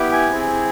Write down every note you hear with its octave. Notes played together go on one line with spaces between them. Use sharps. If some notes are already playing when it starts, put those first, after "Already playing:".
Already playing: B3 E4 G4
G#5
C4 E4 G#4